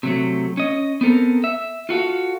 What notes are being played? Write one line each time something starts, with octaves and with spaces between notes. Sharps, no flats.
C3 F#3 A3
C#4 D#5
B3 C4 A4 A#4
E5
F4 F#4 A4 F5